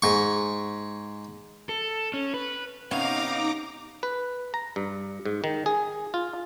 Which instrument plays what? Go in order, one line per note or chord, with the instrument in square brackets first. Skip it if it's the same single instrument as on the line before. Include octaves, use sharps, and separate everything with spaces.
[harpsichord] G#2 C#6
[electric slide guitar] A4
C#4
B4
[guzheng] C3 B3 C#4 [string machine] D#4 A#5 D6 [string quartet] F5
[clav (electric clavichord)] B4
A#5
G2
G#2
D#3
G#4
F4